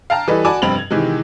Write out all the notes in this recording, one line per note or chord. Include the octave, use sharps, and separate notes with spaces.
F5 G5 A5 A#5 F6
E3 G3 A4 B4 D#5
F#4 D5 G#5 A5 B5 D6
F1 G2 C4 B5 F7 F#7
G#6
C3 D#3 E3 G#3